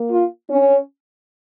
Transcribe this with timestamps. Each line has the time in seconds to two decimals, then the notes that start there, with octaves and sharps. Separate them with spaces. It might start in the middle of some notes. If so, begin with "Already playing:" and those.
Already playing: A#3
0.09 F4
0.50 C#4